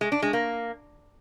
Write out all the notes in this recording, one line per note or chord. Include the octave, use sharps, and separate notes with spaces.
G#3
D4
G#3
A#3